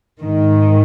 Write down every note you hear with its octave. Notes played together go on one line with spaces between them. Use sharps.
G#2 D#3